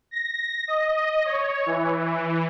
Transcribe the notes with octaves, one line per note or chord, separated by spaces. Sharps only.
A#6
D#5
C#5
E3